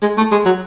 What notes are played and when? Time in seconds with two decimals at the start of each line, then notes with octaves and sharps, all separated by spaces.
0.02 G#3
0.17 A3
0.32 G#3
0.45 F#3